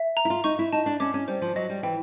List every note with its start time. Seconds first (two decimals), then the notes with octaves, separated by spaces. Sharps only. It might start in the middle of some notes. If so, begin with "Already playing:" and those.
Already playing: E5
0.17 A#5
0.25 E4
0.30 F4
0.44 D#4 C#6
0.59 E4
0.72 D#4 A5
0.86 D4
1.00 C#4 D6
1.14 C#4
1.28 G3 C5
1.42 F3
1.56 F#3 D#5
1.69 G3
1.83 E3 G5